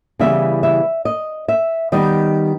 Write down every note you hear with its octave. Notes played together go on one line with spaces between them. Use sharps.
C#3 E3 G3 B3 E5
E5
D#5
E5
D#3 G3 B3 D#4 D#5